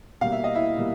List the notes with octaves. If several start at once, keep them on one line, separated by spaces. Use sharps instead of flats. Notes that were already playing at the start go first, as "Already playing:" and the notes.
B2 G3 A#3 F5
E5
D#5
E4 E5
B2 G3 A#3